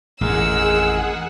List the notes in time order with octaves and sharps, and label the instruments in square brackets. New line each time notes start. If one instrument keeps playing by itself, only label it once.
[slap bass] A1 F2 A2 [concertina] G#3 A#4 [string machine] G#4 F#5 [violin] E6